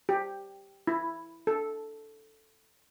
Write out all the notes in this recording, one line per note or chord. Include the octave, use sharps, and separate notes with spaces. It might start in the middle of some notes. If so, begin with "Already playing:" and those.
G4
E4
A4